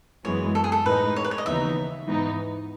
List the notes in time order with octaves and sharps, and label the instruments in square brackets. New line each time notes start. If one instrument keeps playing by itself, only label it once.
[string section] F#2 E3 G#3 B3 [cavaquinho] C#5
[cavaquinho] A4
G#4
A4
[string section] A2 G#3 D#4 [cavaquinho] B4
[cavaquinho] C#5
B4
C#5
D#5
[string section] D#2 C#3 E3 B3 D#4 [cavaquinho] E5
[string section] G#2 E3 B3 D#4